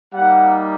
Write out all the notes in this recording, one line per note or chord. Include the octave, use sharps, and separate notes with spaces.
G3 A#3 D#4 F#5